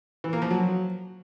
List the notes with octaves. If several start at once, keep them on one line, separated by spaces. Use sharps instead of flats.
E3
A#3
F3
F#3